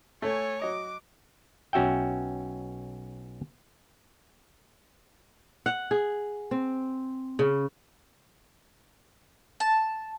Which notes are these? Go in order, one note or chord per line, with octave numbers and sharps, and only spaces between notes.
A3 A4 C#5 G#5
F#3 D#5 D6
B1 C#4 F#4 E5 G5
F#5
G#4
C4
C#3
A5